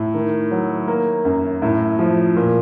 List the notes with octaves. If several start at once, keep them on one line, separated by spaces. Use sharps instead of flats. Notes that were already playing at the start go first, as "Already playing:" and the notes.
Already playing: A2
D#3
F#3
A#3
F#2
A2
F3
A#2